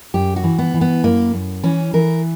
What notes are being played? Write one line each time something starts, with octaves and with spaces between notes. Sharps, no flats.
F#2 G4
F#4
E3
B3
E3
B3
F#2 A#3
F#2
E3 C#4
E3 A#4